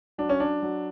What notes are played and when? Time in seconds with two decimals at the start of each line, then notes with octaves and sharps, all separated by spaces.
0.18 F#3 D4
0.29 C#4
0.40 D4
0.62 F#3